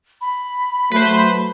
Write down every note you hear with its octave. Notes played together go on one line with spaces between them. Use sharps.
B5
F#3 A3 B4 C5